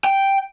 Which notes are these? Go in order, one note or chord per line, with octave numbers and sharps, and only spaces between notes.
G5